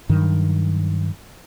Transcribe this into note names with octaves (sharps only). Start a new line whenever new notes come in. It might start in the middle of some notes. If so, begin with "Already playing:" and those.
G2 D#3 F#3